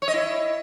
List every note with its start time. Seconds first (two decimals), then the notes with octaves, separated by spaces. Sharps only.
0.02 C#5
0.08 D#5
0.14 E4